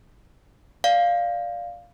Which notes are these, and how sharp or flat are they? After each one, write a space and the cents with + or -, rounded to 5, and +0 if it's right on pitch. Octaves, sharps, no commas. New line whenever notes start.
D5 +0 F5 +0